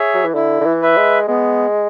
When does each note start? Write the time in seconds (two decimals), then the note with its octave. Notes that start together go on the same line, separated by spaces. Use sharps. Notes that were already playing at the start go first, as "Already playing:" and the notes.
Already playing: G#4 C#5 E5
0.14 F#3
0.25 E3
0.35 D3 E4
0.61 D3
0.66 E3
0.82 B4 E5
0.97 G#3
1.28 G#3 B3